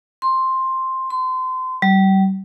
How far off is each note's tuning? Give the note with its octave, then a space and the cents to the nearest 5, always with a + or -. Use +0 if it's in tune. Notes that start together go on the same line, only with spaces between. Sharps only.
C6 +5
C6 -30
G3 -30